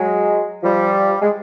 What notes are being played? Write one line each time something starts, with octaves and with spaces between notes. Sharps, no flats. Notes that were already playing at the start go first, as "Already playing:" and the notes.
Already playing: F#3 G#3
F3 G3
G#3